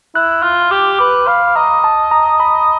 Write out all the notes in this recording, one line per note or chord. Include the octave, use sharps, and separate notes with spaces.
E4 F#6
F4 F6
G4 D6
B4 D6
F5 B5
D#5 A#5
A5
A#5
B5